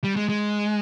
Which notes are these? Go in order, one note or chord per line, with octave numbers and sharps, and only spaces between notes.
G3
G#3
G#3